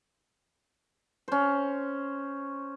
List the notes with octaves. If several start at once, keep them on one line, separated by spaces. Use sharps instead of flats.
C#4 C5